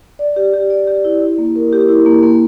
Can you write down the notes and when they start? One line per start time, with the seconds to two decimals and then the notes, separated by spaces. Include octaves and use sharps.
0.19 D5
0.36 G4
0.53 G4
0.70 D5
0.87 G4
1.04 E4
1.21 E4
1.38 A#3
1.56 A#4
1.73 G4
1.89 E4
2.06 A#3
2.23 A#3